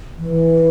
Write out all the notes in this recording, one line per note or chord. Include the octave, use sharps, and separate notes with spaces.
E3